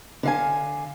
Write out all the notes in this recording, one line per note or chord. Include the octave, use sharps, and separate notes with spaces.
D3 F5 G#5